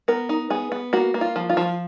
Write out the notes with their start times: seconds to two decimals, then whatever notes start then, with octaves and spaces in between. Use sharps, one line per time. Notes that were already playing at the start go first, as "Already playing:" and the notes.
0.08 B3 A#4
0.29 D#4
0.50 B3 G#4
0.72 B3
0.93 A#3 F#4
1.14 A#3
1.21 F4
1.36 F3
1.50 F4
1.57 F3